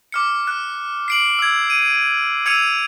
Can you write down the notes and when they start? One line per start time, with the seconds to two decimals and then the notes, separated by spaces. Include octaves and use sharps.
0.12 D6 F6 C#7
0.47 F#6
1.08 C7 D7 F#7
1.39 E6 G#6
1.70 D#7
2.46 E6 G#6 C#7 D#7 F7